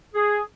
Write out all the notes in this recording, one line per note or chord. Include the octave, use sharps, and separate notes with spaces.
G#4